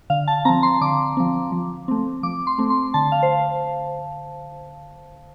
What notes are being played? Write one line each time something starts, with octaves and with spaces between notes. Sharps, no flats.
D3 F5
A5
F3 C4 A#5
C6
D3 D6
F3 C4
F3
A3 C4
F3 D6
C6
A3 C4
C6
D3 A5
F5
C5